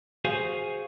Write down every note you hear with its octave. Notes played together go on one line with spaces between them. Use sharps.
F#4 G#4 C5 F5 G#5